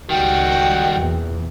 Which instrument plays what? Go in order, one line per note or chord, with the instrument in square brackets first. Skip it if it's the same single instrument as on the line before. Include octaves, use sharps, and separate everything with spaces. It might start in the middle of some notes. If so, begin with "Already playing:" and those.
[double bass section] C#2 [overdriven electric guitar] D#3 G3 [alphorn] F#4 [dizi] G5
[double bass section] E2 A#2